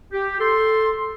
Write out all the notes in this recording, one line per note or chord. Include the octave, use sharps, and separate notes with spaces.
G4
A4 C6